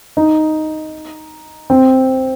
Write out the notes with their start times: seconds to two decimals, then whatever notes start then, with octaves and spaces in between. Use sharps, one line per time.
0.17 D#4
1.70 C4